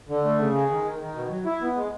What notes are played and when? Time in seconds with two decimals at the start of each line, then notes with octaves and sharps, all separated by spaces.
0.09 D3
0.24 A3
0.39 C#3
0.54 G#3
0.70 D#3
0.84 D#3
0.99 D#3
1.15 B2
1.30 F#3
1.45 E4
1.61 B3
1.76 G#3